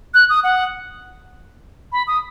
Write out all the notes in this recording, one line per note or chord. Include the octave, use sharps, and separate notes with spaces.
F#6
D#6
F#5
B5
D#6